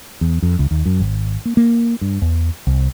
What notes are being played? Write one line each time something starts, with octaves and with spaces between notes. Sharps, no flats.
E2
F2
C#2
D#2
F#2
G#1
A#3
A#3
G2
E2
C2